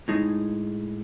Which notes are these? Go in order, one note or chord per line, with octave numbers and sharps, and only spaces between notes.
A2 G#3 D#4